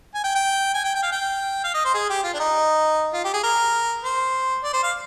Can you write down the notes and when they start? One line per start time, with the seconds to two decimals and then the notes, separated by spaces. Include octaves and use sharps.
0.15 G#5
0.24 G5
0.35 G5
0.75 G#5
0.85 G5
0.95 G5
1.03 F5
1.12 G5
1.64 F5
1.74 D#5
1.85 C5
1.94 G#4
2.10 G4
2.24 F4
2.34 D4
2.40 D#4
3.13 F4
3.24 G4
3.34 G#4
3.43 A#4
4.04 C5
4.63 D5
4.73 C5
4.83 F5